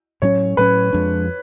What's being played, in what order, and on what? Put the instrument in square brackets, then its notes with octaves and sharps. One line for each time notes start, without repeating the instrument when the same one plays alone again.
[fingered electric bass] A2 F#3 C#4 [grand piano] C#5
[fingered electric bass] A2 F#3 C#4 [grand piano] B4
[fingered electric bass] F2 F3 G#3 D4